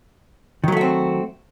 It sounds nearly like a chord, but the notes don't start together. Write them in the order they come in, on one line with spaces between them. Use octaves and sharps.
D#3 F#3 A3 F#4 C4